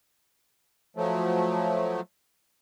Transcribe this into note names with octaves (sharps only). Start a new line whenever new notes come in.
F3 F#3 A3